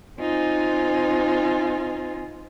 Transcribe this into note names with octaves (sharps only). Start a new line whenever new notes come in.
C4 D#4 F4 C5 G#5